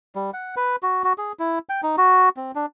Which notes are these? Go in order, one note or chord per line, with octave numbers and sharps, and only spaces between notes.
G3
F#5
B4
F#4
F#4
G#4
E4
G5
D#4
F#4
C4
D4